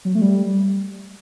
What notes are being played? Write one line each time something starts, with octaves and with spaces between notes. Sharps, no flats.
F#3
A3
G3